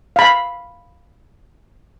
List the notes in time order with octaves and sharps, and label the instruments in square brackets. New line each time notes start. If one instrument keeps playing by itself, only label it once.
[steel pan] F5 B5